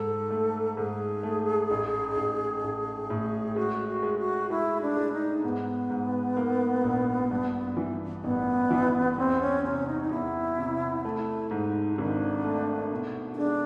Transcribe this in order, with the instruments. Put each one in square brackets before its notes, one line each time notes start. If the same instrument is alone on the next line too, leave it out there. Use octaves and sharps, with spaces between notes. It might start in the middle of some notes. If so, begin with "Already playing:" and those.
Already playing: [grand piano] G#2 [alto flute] A4
[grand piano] A3
[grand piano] G#2 [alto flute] G#4
[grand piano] A3
A1
A1
A1
A2
[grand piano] G#3 [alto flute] F#4
[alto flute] F#4
[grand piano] G#3
[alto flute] F#4
[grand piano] G#3 [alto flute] E4
[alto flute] D4
[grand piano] G#3
[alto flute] D#4
[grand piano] G#2 [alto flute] B3
[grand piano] G#2
A#3
A#1
G2
E3
[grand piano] A1 [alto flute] B3
[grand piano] E3
[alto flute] B3
[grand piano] E2 [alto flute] C4
[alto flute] C#4
[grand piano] C3 [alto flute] C#4
[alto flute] D#4
D#4
[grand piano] E2 [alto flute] E4
[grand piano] C3
[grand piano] A3 [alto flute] E4
[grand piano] G#2 [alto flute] D#4
[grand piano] G#1 [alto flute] D4
[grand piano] A3
B2
[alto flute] D#4
[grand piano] G#3 [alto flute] D4